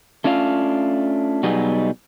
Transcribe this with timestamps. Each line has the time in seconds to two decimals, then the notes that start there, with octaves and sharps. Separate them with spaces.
0.24 A3 C#4 D4 F4 F5
1.43 B2 F#3 G3 B3 D#4 G#4